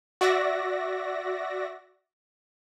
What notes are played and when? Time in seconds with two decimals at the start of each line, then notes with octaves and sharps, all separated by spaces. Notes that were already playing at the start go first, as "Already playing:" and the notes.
0.21 F#4 D5 E5 A#6